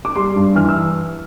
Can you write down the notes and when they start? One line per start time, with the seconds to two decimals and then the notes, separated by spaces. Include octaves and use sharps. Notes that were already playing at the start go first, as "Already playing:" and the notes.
0.05 D6
0.15 G3 C6
0.36 G2
0.55 E3 F6
0.69 E6